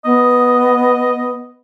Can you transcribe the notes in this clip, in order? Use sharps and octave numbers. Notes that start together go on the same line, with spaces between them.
B3 D#5